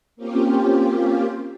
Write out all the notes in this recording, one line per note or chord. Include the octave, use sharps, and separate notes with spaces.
A#3 C4 C#4 F4 G4